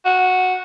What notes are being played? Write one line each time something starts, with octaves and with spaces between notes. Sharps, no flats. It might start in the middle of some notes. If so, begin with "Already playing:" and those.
F#4